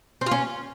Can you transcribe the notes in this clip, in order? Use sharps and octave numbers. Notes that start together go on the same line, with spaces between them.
C4
F4
C#4